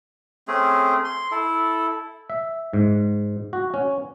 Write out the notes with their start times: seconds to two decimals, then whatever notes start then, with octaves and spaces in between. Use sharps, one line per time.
0.48 A3 C4 C#4 G#4
1.04 C6
1.31 E4 A4
2.30 E5
2.73 G#2
3.53 F#4
3.74 C#4